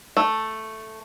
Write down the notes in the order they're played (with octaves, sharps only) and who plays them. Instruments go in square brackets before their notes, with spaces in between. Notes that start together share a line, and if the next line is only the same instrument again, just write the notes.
[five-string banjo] A3